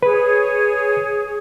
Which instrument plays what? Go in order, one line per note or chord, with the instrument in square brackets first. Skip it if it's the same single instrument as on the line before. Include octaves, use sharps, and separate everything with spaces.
[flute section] G#4 C#5 [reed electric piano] B4